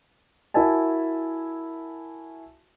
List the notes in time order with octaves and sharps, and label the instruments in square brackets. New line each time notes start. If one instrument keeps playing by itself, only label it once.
[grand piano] E4 F#4 A#4 E5 G#5 A5